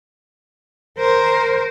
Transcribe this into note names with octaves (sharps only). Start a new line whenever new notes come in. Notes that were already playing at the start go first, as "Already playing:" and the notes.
A#4 C5